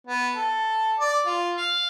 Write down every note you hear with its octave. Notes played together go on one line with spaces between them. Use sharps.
B3
A4
D5
F4
F5